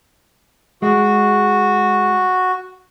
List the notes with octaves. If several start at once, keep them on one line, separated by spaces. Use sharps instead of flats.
G#3 F#4